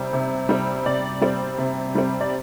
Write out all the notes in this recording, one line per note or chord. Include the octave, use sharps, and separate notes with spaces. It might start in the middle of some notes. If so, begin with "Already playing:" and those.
Already playing: C3 G3 C4
C3
G3 C4
C3 D5
G3 C4
C3
G3 C4
D5